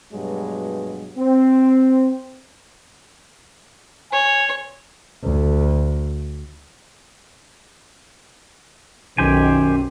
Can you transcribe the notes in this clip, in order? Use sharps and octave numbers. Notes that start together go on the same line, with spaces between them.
G2 B2 F#3 G#3
C4
C#5 G#5
D2
B1 F#2 D#3 G4 C5 G#5